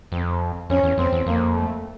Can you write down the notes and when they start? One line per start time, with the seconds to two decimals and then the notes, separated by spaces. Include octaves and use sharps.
0.12 F2 C4
0.70 F2 C#4
0.83 E2
0.98 F2 C4
1.13 E2
1.26 F2 A#3
1.55 A3